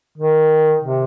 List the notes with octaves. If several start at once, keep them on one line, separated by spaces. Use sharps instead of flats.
D#3
C3